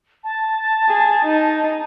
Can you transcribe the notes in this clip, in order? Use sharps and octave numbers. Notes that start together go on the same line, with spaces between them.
A5
G#4
D#4